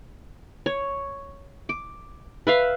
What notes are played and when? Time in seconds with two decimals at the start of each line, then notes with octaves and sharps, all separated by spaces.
0.66 C#5
1.69 D6
2.47 B4 E5 F5